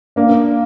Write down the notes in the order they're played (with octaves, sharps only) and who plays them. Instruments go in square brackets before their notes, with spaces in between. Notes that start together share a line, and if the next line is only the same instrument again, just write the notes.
[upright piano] A#3 D4